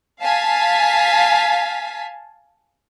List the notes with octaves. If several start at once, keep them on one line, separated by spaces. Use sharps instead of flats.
F5 G#5 A5 B6